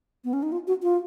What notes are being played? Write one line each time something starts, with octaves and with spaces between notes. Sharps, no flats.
B3
C#4
D#4
F4
F#4
F4